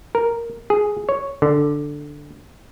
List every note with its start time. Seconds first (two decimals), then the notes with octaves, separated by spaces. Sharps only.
0.15 A#4
0.70 G#4
1.09 C#5
1.42 D3